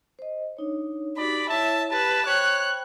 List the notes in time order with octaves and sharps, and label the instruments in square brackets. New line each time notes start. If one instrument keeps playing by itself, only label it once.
[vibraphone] C5 D#5
D4 D#4 C#5
[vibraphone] D#4 F#4 G4 [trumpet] D5 [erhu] B5
[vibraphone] E4 C#5 [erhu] E5 [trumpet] A5
[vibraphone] G4 [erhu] B4 [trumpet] A5
[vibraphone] C5 G5 B5 [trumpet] C#5 [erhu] F#6